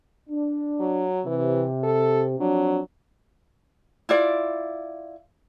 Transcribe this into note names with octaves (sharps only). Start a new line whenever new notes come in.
D4
F#3
C3 E3
A4
F3 F#3 C4 D4
E4 F4 D5